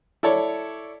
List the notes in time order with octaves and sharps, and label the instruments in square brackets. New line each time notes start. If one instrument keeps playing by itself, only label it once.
[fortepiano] E4 A4 C#5 D5